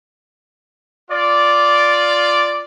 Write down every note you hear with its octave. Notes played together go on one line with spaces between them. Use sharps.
F4 D5